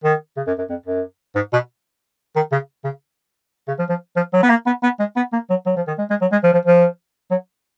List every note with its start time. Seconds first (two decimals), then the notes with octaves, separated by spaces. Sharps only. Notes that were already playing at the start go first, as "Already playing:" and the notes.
0.04 D#3
0.37 C#3
0.47 F#2
0.58 F#2
0.70 F2
0.86 F#2
1.35 G#2
1.53 B2
2.36 D#3
2.52 C#3
2.84 C#3
3.68 C#3
3.79 F3
3.89 F3
4.16 F3
4.33 F#3
4.43 B3
4.50 A#3
4.66 B3
4.83 B3
5.00 G#3
5.17 B3
5.33 A#3
5.50 F#3
5.66 F#3
5.77 F3
5.88 D#3
5.99 G#3
6.10 G#3
6.21 F#3
6.32 G#3
6.43 F3
6.53 F3
6.65 F3
7.31 F#3